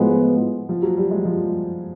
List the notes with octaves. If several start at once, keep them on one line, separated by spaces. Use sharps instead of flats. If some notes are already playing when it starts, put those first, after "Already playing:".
Already playing: A2 F3 F#3 G#3 B3
F3
F#3
G3
G#3
F3